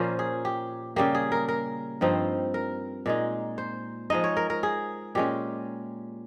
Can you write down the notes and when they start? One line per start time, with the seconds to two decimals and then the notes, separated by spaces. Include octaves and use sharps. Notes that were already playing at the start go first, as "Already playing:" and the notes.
Already playing: A#2 F3 A#3 C#4 C5
0.19 G#4
0.45 G4
0.96 C#3 G3 A#3 G4
1.15 G#4
1.32 A#4
1.48 A#4
2.01 G2 F3 C4 D#4
2.54 A#4
3.06 A#2 G#3 D#4
3.58 C5
4.10 F3 G#3 D#4 D#5
4.24 C#5
4.37 A#4
4.50 A#4
4.63 G#4
5.15 A#2 G#3 C#4 G4